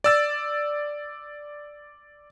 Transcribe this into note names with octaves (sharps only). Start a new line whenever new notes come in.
D5 E6 A6